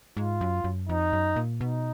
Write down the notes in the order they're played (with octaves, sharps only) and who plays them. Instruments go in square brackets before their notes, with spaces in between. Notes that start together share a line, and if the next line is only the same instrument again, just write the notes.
[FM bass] G#2 [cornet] F4
[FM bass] F#2
F#2
[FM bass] F2 [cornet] D#4
[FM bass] F#2
A#2
[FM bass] B2 [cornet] D#4